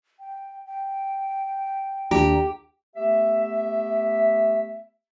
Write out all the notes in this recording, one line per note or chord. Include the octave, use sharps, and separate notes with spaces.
G5
G5
D#2 D4 G4 A#5
A3 B3 G4 E5